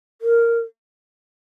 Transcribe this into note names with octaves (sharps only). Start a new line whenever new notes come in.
A#4